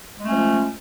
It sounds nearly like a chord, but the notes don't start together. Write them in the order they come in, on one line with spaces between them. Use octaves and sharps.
G#3 A3 C#4 F3